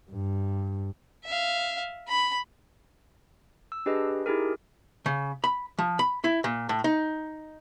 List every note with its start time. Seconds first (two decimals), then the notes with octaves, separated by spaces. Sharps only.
0.11 G2
1.25 E5 F5
2.08 B5
3.72 E6
3.86 D4 G4 G#4 B4 D#5
4.26 D#4 E4 G4 G#4 A#4
5.06 C#3
5.44 B5
5.79 F3
5.99 B5
6.24 E4
6.44 A#2
6.69 A2
6.84 D#4